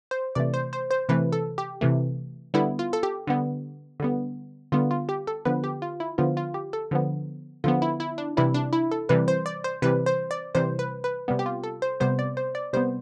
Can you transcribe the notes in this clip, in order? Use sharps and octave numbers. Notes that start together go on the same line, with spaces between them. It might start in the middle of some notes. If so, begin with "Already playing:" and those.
C5
C3 E3 A3 D5
C5
C5
C5
C3 E3 A3 B4
A4
G4
C3 E3 A3
D3 G3 B3 E4
F4
A4
G4
D3 G3 B3
D3 G3 B3
D3 G3 B3 F4
F4
G4
A4
D3 F3 B3 B4
G4
F4
E4
D3 F3 B3 F4
F4
G4
A4
D3 F3 B3
D3 F3 B3 F4
E4
E4
D4
C3 E3 G3 E4
D4
E4
A4
C3 E3 G3 B4
C5
D5
C5
C3 E3 G3 B4
C5
D5
C3 E3 G3 C5
B4
B4
C3 G3 B3
G4
F4
A4
C5
C3 G3 B3 C5
D5
C5
D5
C3 G3 B3 C5